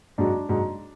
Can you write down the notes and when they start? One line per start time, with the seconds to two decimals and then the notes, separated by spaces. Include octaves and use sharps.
0.18 G#2 F#3 D4
0.49 G#2 F#3